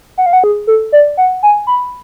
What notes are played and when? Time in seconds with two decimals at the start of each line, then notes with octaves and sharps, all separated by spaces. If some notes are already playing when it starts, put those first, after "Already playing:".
0.18 F#5
0.26 F5
0.33 F#5
0.44 G#4
0.67 A4
0.92 D5
1.17 F#5
1.43 G#5
1.67 B5